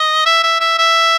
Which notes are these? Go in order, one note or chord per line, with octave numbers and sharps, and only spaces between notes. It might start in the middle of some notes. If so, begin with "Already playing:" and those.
Already playing: D#5
E5
E5
E5
E5